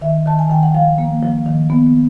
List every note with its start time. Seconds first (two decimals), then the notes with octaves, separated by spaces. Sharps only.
0.01 D#3 E5
0.26 D#3 A5
0.39 G#5
0.50 D#3 G5
0.63 F#5
0.75 F3 F5
0.98 A#3
1.23 F3
1.46 D#3
1.70 B3